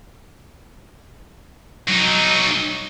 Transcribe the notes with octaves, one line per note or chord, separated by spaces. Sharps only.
F#3 D#4